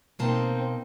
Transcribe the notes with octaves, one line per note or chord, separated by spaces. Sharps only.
B2 A#3 C4 D#4 A5